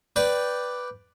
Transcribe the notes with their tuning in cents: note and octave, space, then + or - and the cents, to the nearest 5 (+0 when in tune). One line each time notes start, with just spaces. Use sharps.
B4 +0 D5 +0 G5 +0